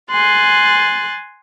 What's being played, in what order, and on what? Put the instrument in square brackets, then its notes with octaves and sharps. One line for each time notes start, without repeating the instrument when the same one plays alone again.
[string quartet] G#5 C6 F#6 A6